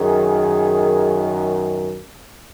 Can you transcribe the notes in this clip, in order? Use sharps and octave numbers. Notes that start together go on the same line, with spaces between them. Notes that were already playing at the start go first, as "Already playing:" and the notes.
Already playing: F#2 D#3 G#4